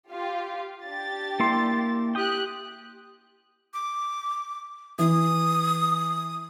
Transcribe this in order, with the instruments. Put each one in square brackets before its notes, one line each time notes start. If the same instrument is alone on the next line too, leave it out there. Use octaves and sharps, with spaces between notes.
[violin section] F4 G4 F5
D4 G4 A6
[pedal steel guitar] A#3 E4 C6
[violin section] G4 F#6 [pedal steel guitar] G5 D#6
[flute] D6
[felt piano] E3 [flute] D#6